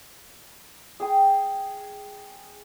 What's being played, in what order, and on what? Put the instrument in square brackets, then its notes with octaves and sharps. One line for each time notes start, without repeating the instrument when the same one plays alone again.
[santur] G#4 G5 D#6